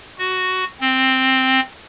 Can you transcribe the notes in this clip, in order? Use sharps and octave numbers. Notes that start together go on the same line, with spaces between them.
F#4
C4